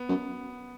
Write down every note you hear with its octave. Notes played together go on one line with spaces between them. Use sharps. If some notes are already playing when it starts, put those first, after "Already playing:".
Already playing: B3
F#2